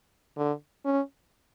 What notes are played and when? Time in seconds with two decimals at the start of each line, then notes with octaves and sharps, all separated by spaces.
0.37 D3
0.85 C#4